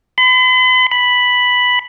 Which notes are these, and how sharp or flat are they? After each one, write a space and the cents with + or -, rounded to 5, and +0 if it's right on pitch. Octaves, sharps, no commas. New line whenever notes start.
B5 +45
B5 +0